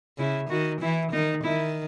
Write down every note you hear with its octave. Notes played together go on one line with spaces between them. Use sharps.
C#3 E4
D#3 F#4
E3 E4
D#3 D#4
D#3 E4